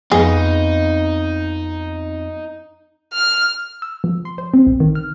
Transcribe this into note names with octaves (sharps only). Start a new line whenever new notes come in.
F2 B3 C4 D#4 G#4
F6
E6
F3
C6
C5
C4
A#1
D#3
F6